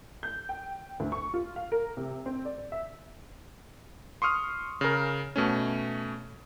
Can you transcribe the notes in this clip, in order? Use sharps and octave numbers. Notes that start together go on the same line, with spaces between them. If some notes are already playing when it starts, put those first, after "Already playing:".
G6
G5
D2
C#6
F4
F5
A#4
C3
C4
D5
E5
C6 C#6 D#6 F6
C#3 A#4
B2 A3 C#4